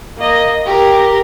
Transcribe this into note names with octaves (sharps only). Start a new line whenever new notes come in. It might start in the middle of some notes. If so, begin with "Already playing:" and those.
A#3 D#5
G4 A#4